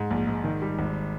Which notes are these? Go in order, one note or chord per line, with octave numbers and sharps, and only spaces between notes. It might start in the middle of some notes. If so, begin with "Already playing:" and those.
Already playing: G#2
A#1
G#2
D#3
G3
G#1